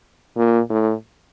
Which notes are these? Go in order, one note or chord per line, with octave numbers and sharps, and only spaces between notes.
A#2
A2